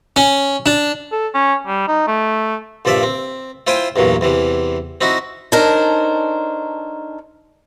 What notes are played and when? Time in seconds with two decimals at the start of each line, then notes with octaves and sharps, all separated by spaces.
0.16 C#4
0.66 D4
1.12 A4
1.34 C#4
1.67 G3
1.88 D#4
2.08 A3
2.85 A#1 G2 F3 D5 E5
3.03 C4
3.67 E4 F4 C5 G5 G#5 C6
3.96 E2 G2 A#2 F#3
4.21 E2 C3 E3
5.01 C4 D#4 E4 F#4
5.52 D4 D#4 A4 A#4 C5 C#5